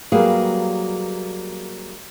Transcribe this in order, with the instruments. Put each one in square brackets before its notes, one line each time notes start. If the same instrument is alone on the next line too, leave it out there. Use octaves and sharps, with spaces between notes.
[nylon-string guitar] F#3 G3 A#3 G#4 B4 F5